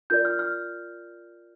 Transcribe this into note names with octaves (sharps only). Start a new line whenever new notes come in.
F4 A#4 D5 G6
F6
F6